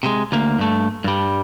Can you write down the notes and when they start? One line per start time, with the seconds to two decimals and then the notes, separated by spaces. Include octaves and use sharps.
0.03 C3 G#3
0.32 D2 A#3
0.59 G2 A3
1.04 G2 G3